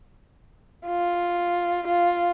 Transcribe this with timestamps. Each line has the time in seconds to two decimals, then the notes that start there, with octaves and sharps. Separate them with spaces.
0.88 F4
1.87 F4